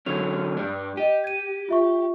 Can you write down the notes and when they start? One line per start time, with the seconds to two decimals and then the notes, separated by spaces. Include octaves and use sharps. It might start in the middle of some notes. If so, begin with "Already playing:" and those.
0.06 D3 F#3 C#4 G#6 F7
0.57 G2 G3 D4
0.97 G4 D#5 D#7
1.24 G#6 D#7
1.69 F4 E5 C#6